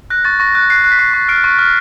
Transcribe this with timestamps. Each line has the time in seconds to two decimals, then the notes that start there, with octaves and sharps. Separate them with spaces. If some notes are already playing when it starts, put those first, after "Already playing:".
0.10 F#6 A#6
0.25 C#6 A6
0.40 C#6 A#6
0.55 F#6
0.70 F#6 C7
0.84 F#6
0.91 B6
0.99 C#6 C7
1.14 C#6
1.29 F6 C7 D7
1.44 C#6
1.59 F6